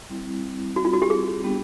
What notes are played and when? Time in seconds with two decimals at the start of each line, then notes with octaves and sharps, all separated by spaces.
0.09 G3 C4 E4
0.76 F#4
0.85 F4
0.93 F#4
1.02 G4
1.10 G#4
1.44 G3 B3 D4 G4